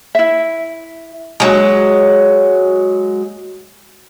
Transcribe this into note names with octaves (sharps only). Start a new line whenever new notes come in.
E4 E5
F#3 G#3